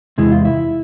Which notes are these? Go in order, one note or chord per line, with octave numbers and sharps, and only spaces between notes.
E2 C3 G#3 E4 G#4
F4
E4